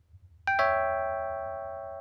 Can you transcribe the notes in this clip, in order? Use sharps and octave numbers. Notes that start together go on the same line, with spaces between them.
G5
C#5 E5